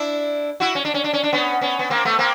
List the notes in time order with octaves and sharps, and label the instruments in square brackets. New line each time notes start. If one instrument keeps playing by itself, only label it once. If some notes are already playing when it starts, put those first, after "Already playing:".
Already playing: [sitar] D4 E4
E4 F#4
C#4
D4
C#4
D4
C#4
D4
B3 C#4
B3 C#4
B3
A#3 C4
A3 B3
A#3 C4